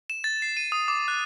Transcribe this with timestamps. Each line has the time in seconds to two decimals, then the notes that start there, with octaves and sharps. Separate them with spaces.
0.10 E7
0.24 A6
0.42 C7
0.57 D#7
0.72 D#6
0.88 D6
1.08 F#6